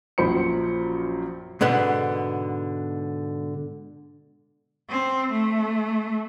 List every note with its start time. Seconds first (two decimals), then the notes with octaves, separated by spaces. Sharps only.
0.18 A#1 F#2 F3 C5 B5 C#7
1.61 G#2 B2 D3 B3
4.88 C4
5.30 A3